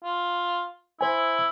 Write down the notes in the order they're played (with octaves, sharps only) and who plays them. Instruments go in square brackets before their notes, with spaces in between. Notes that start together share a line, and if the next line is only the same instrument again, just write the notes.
[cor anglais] F4
[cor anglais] E4 [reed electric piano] C5 G#5